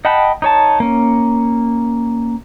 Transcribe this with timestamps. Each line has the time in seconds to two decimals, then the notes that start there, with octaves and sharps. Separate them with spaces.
0.05 D#5 F#5 G5 A5 B5
0.42 D#4 C#5 A5
0.80 A#3 C#4